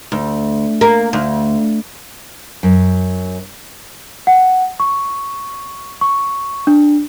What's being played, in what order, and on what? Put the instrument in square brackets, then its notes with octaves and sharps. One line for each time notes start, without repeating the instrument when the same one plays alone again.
[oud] D2
A#3
D2
[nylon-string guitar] F#2
[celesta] F#5
C#6
C#6
D4